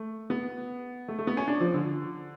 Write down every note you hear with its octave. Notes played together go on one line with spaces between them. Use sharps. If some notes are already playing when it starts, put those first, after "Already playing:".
Already playing: A3
B3
A3
A3
B3
C#4
D4
F3
D3